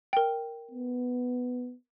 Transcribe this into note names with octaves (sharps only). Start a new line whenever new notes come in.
A#4 G5
B3